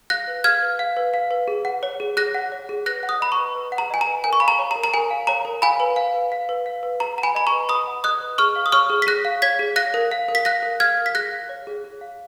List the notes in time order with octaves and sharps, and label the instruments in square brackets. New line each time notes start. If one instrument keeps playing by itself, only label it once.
[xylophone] F5 F#6 A#6
B4
F5 F6 G#6
B4
F5
B4
F5
B4
G#4
F#5
C#5
G#4
G#4 F#6 A#6
F#5
C#5
G#4
B4 F#6 A#6
F#5
D#6 F#6
D#5 B5
A#5 C#6
B4
B4
F#5
A#5
D#5 G#5
A#5
B4
A#4 G#5
C#6
F5 B5
A#5
C#5
A#5
A#4
A#5
A#4 G#5
F5
C#5 A#5
A#4
F5 G#5 B5
B4
F5
B4
F5
B4
F5
B4
B4 A#5
F#5 A#5
G#5 B5
D#5 B5
A#5 C#6
B4
B4 B5 D#6
F#5
D#5 D#6 F#6
B4
G#4 C#6 F6
F5
D#6
C#5 C#6 F6
G#4
B6
G#4 F#6 A#6
F5
C#5 G#6 B6
G#4
F5 F#6 A#6
A#4
F5
A#4
B6
F5 F#6 A#6
A#4
F5 F6 G#6
A#4
B6
G#4 F#6 A#6
F5
C#5
G#4
G#4
F5